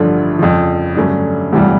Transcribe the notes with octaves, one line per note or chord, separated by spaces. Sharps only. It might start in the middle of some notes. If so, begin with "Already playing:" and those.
Already playing: A1 G2 D3 F3 A3
F2 C#3 F3
G2 D3 F#3 A3 C#4
E1 D2 C3 E3 G3